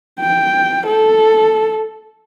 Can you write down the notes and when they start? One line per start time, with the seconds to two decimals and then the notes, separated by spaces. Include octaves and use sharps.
0.20 G5
0.87 A4